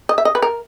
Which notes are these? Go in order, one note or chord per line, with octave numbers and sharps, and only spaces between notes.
D#5
E5
D#5
B4
A#4